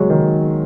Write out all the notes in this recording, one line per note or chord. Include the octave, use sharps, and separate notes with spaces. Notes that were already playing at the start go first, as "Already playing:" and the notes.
Already playing: F#3 G#3
D#3